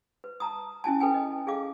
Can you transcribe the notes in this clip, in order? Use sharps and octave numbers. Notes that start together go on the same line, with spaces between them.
B4
A5 A#5 D#6
C#4 E4 G#5 A5
A4 B4 G5 G#5
D#5
G#4 A4 F5 D6